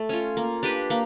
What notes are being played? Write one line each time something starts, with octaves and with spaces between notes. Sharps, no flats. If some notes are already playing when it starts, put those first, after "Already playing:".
Already playing: A3
C#4 F4
A#3
D4 G4 B4
A#3